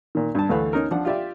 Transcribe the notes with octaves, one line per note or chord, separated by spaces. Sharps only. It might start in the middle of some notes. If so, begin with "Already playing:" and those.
A#2 D#3
G2 A5
D2 E3 A3 B4 F5 B5
C#4 D#4 A#4
F3 D4 F#5
F4 G4 D5 E5